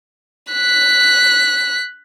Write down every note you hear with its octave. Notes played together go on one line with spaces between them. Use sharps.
F#6 B6